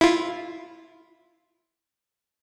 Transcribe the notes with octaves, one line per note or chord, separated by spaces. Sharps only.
E4 F4